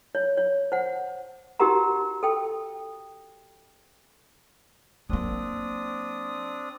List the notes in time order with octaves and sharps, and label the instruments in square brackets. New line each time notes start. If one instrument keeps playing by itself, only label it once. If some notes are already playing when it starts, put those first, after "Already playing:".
[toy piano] C#5
C#5
C5 F#5
D#4 F#4 G4 A#4 F#5 A#5
A4 G5
[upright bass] F#3 A#3 [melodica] C4 D4 D#6